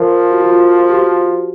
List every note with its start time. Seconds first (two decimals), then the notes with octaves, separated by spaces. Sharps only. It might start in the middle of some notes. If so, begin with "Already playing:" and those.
Already playing: F3 A#4
0.31 F#4
0.40 F4
0.89 G4
0.93 F#4